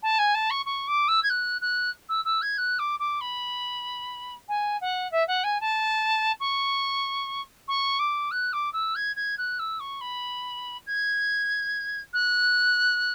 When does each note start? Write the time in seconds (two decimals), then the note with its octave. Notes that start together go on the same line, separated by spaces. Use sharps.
0.02 A5
0.18 G#5
0.34 A5
0.50 C#6
0.65 C#6
0.87 D6
1.08 E6
1.22 G#6
1.29 F#6
1.61 F#6
2.09 E6
2.24 E6
2.41 G#6
2.57 F#6
2.79 D6
2.99 D6
3.20 B5
4.48 G#5
4.81 F#5
5.11 E5
5.27 F#5
5.43 G#5
5.60 A5
6.40 C#6
7.68 C#6
7.99 D6
8.31 F#6
8.53 D6
8.73 E6
8.95 G#6
9.16 G#6
9.37 F#6
9.59 E6
9.79 C#6
10.00 B5
10.86 G#6
12.13 F#6